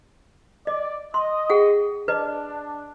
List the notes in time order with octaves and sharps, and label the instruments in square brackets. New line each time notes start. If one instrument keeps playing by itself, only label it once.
[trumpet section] D5 [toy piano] D#5
[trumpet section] D#5 [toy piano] C6
[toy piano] G#4 F#5 G5
[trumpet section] D4 [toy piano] B4 D#5